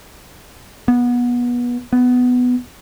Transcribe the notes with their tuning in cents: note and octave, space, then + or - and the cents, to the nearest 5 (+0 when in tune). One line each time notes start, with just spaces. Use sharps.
B3 -25
B3 +10